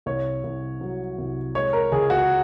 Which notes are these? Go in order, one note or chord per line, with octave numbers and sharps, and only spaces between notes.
C2 C#5
C2
F#3
C2
G#3 C#5
A#4
C#2 G#4
F#4